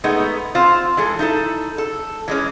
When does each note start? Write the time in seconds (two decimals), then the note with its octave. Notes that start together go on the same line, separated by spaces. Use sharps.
0.04 G#3 A3 B3 D#4
0.55 C4 F4 C5
0.97 E3 G#3 A4
1.19 D#4 E4 A4
1.78 A4
2.28 E3 G#3 C#4